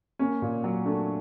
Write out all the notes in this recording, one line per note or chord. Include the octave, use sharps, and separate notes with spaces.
A#3 C#4
A#2
F#3
A3 D4